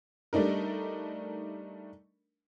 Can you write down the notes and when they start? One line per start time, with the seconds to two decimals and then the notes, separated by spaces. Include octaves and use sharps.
0.33 G3 A3 D4 D#4 A#4